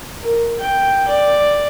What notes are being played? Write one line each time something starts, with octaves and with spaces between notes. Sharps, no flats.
A#4
G5
D5